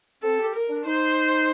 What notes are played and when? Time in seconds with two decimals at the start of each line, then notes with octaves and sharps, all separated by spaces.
0.23 C4 A4
0.39 G4
0.55 A#4
0.70 D4
0.86 D#4 C5